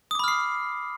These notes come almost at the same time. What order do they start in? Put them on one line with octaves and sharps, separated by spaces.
D#6 D6 B5 F6 C7